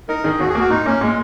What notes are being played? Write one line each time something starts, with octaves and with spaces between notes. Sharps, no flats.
D#4 A#4
D#3 G#4
D#2 F#4
G#4
A#3 F#4
A#2 D#4
A#3 C#4
A#2 G#3